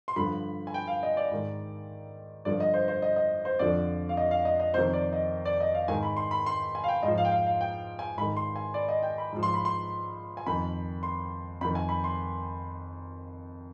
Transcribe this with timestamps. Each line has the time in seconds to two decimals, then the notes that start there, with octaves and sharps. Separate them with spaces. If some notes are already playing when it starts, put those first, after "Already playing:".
0.08 C6
0.16 G2 D3 F3 B5
0.67 G#5
0.74 G5
0.88 F5
1.03 D#5
1.17 D5
1.31 G#2 D#3
2.45 G2 D3 F3 D5
2.60 D#5
2.74 C5
2.88 C5
3.02 D#5
3.16 D#5
3.45 C5
3.59 F2 D3 F3 D5
4.09 F5
4.17 D#5
4.31 F5
4.45 D#5
4.60 D#5
4.74 F2 C3 D#3 C5
4.93 D5
5.13 D#5
5.45 D5
5.60 D#5
5.74 F5
5.88 G#2 D#3 G#5
6.03 B5
6.17 C6
6.31 B5
6.46 C6
6.75 G#5
6.84 F5
6.88 G5
7.03 G#2 F3 D#5
7.18 F5
7.25 G5
7.32 F5
7.47 F5
7.61 G5
7.99 G#5
8.17 G#2 B5
8.21 D#3
8.37 C6
8.56 G#5
8.74 D5
8.89 D#5
9.03 G5
9.18 B5
9.32 G#2 F3
9.43 C6
9.54 B5
9.65 C6
10.37 G#5
10.46 F2 D#3 B5
11.03 C6
11.61 F2 B5
11.65 D#3
11.75 G#5
11.89 B5
12.04 C6